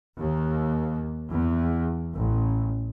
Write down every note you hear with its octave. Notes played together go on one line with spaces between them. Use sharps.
D#2
E2
A1